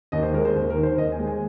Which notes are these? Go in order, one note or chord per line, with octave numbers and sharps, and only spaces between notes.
D#2 D#5
C5
G#3 A#4
C5
D#2 C5
A#4
D#3
C5
D#2 D#5
G#5
G#3
G#5